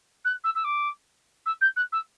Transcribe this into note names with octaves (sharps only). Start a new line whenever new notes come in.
F#6
E6
E6
D6
E6
G6
F#6
E6